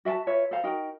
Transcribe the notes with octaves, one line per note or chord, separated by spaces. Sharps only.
F#4 E5 F#5 A5
F4 B4 C#5 E5
A4 C5 F5 A#5
D#4 F#4 A#4 G5